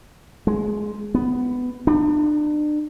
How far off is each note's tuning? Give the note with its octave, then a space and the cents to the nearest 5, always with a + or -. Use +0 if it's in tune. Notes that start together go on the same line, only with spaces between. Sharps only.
G#3 +5
B3 +10
D4 +35